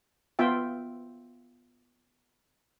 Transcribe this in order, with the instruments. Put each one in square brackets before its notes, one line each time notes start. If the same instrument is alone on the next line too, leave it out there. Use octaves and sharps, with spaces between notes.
[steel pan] B3 F4 E5 G5